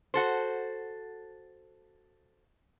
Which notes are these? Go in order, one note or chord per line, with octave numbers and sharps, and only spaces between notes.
F#4 A4 C5